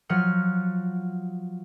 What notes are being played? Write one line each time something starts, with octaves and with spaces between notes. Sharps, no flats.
F3 F#3 F#5 F6 C#7